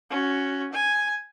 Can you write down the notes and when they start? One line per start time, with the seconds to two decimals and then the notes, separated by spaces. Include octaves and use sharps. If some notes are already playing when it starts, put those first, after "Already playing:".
0.10 C#4 F#4
0.73 G#5